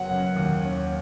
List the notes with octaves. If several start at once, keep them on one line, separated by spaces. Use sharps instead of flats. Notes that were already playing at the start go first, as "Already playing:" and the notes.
Already playing: F#1 F#3 B3 F#5
F#2
D#2
C#4